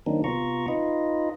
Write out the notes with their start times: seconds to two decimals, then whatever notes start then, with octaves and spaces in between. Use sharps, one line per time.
0.06 D#3 F#3 A#3 C4 D4 D#4
0.24 C3 B3 F4 A#5 C#6
0.68 D#4 F4 B4 D#5